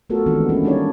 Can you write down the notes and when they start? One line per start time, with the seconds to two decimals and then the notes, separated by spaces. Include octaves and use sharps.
0.10 A3 B3 F4 F#4 A4 A#4
0.26 D#3 E3 G#3 B3 C4 D4
0.49 A#3 C#4 E4
0.64 G3 D4 D#4 G4 C#5 D5